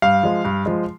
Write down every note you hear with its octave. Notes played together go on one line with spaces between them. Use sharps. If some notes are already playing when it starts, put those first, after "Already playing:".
G2 F5
F3 G#3
G2
F3 G#3